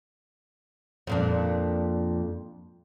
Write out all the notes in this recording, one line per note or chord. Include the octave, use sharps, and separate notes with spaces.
F2 A#2 D4